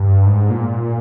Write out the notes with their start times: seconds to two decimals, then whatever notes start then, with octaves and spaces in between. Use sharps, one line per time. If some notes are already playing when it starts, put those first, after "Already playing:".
Already playing: G2
0.26 G#2
0.50 A#2